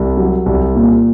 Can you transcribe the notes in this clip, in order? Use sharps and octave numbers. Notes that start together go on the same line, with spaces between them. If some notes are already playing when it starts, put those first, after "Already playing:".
Already playing: C2
F#3
C2
A#2